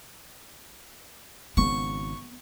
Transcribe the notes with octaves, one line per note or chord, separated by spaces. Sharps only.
G#1 C#3 B3 C#6